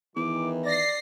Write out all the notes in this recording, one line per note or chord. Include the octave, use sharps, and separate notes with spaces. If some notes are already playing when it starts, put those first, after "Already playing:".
E2 D#3 E3 D6
D5 A#6 C7